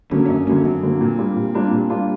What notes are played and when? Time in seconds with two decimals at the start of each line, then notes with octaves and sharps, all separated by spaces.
0.11 D3 F#3 A#3 C#4
0.29 F#2 C#4
0.47 D3 F#3 A#3 C#4
0.65 F#2 C4
0.83 D3 F#3 A#3
1.01 A#2
1.18 G3 A#3 D4 F4
1.36 A#2
1.54 G3 A#3 D4 F4
1.72 A#2
1.90 G3 A#3 D4 F4